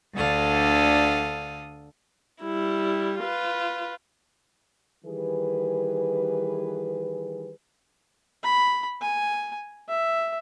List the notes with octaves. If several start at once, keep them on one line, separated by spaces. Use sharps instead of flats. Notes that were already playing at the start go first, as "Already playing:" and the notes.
D2 D3 A4 F5 D#6
G3 E4
F4 B4
D#3 E3 G3 G#4 B4
B5
G#5
E5